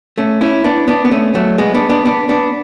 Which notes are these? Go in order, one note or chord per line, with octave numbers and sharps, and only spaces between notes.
A3 C#4
C#4 E4
B3 D4
B3 D4
B3
A3 C#4
F#3 A3
G#3 B3
B3 D4
B3 D4
B3 D4
B3 D4